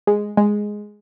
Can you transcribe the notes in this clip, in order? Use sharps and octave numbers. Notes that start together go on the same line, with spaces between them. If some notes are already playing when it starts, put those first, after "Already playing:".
G#3
G#3